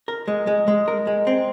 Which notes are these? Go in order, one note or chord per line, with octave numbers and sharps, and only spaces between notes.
A#4
G#3
G#3
G#3
A#4
G#3
C4